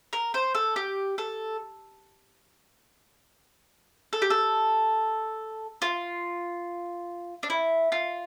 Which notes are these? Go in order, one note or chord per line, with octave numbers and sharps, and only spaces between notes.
A#4
C5
A4
G4
A4
A4
G4
A4
F4
D4
E4
F4